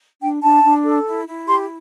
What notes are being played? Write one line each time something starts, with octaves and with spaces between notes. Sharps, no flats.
D4 G5
D4 A5
D4
A4
E4
E4
G4 C6